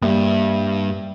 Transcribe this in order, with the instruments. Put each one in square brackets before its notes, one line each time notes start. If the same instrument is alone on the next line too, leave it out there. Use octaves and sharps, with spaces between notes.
[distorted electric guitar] G2 [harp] G3 E5 [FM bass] A#3